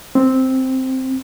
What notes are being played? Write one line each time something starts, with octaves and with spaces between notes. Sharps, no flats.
C4